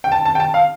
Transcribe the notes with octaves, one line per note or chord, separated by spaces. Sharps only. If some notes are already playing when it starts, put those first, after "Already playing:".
G5
A5
A5
G5
A5
F5